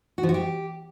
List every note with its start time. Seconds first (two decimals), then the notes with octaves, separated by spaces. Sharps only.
0.18 F#4
0.23 F3
0.29 F#4
0.34 G4